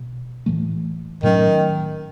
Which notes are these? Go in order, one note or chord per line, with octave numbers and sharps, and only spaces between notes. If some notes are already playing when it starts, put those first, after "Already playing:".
Already playing: B2
A2 E3 A3
A2 D#3 F#3 A3 C#4